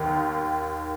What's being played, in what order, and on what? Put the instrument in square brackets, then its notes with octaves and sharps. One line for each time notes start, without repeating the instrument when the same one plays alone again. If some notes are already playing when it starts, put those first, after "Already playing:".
Already playing: [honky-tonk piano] D#2 D#3